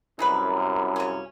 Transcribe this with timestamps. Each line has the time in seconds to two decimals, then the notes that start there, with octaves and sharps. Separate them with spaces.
0.19 C2 F#2 D#4 G#4 B4
0.96 C#3 C#4